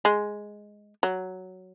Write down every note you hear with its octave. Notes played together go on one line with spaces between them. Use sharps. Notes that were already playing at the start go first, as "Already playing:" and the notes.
G#3
F#3